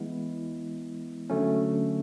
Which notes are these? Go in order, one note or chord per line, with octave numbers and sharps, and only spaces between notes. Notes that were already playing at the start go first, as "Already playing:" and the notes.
Already playing: E3 G#3 B3 E4
D3 F#3 A3 C#4